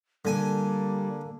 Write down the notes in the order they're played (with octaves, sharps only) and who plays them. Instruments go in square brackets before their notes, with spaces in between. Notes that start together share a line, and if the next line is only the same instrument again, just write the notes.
[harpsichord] D3 G#5 [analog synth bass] G3 [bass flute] A#3